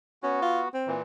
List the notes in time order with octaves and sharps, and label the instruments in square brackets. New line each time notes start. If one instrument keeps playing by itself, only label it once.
[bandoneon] B3 F#4 [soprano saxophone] C#4
[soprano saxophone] F4
C4
[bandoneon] A#2 E3